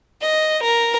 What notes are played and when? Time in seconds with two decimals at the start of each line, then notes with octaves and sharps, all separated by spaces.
0.20 D#5
0.62 A#4